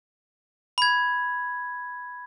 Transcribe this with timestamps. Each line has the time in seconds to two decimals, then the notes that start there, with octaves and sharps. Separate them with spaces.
0.78 B5 G#6